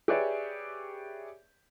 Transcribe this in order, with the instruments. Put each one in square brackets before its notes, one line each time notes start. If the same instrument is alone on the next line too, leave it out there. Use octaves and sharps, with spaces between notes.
[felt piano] G4 G#4 B4 C#5 D5 E5